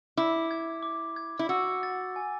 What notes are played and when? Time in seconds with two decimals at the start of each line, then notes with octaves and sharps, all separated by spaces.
0.17 E4 D6
0.51 G#6
0.83 D6
1.16 G#6
1.39 E4
1.49 F#4 E6
1.83 A6
2.16 G#5